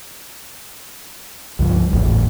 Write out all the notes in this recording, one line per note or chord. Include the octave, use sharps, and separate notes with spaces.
C#2 G2 F3
G#1 E2 A2